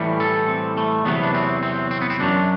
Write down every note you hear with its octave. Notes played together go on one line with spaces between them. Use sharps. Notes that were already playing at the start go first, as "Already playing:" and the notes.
Already playing: A2 E3 G3
A4
C4
A3
E2 C3 F#3 B3
D4
C4
C4
C4
B3
C4
F#2 F#3 D4